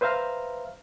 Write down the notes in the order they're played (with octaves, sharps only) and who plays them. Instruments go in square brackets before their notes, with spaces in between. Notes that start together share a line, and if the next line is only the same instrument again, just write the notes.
[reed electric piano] B4 C5 E5 F5 A#5 F6